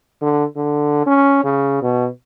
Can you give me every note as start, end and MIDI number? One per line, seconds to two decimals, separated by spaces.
0.22 0.44 50
0.56 1.03 50
1.06 1.40 61
1.44 1.81 49
1.82 2.08 47